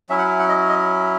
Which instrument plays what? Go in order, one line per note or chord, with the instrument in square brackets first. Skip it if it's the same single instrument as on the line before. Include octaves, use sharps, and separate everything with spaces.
[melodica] F#3 C#4 E4 E5
F#5
F#5
D#5
D#5